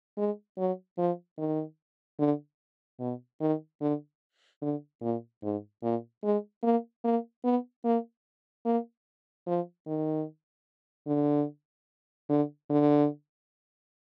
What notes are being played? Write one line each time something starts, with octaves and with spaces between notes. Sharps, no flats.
G#3
F#3
F3
D#3
D3
B2
D#3
D3
D3
A#2
G#2
A#2
G#3
A#3
A#3
B3
A#3
A#3
F3
D#3
D3
D3
D3